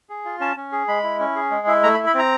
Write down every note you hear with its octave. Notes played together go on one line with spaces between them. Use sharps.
G#4
F4
C#4 A5
C#4
G#4
G#3 B5
E4
C#4
G#4
G#3
E4
A3 A#5
B5
E4
B5
C4 A#5